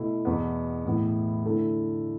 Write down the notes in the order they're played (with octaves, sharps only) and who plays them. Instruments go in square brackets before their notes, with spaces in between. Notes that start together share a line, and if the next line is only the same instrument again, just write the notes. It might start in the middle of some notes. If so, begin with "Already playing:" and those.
Already playing: [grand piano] B2 A3 E4
E2 B2 B3
A2 E3 B3 E4
D3 A3 E4